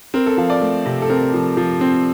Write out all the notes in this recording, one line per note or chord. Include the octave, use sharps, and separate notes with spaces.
C4 A#4
A4
F3 F5
D5
A3
C3
A4
C4 A#4
F3
F3
C4